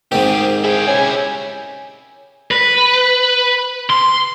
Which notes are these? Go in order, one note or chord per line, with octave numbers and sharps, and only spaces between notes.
G#2 D#3 C4 G4 G#4
E4 G4 G#4
C#4 G#5
B4
C6